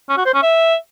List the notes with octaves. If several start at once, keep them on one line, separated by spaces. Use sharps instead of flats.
C#4
F#4
C5
C#4
E5